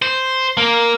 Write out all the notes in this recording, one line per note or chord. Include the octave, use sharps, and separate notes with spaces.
C5
A#3